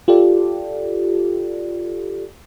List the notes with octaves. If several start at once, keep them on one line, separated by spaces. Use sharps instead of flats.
F4 G4 A4 D5